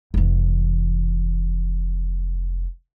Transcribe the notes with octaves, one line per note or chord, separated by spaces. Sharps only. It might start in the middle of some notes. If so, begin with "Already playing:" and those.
F1 E3